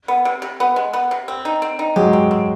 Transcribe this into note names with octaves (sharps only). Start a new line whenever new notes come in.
B3
C3
C3
B3
G#3
B3
C3
C4
D#4
C4
D#4
F#3 G#3 G4
C4
C4